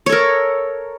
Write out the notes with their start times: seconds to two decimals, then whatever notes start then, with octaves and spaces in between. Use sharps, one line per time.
0.06 C#5
0.09 A4
0.12 A#4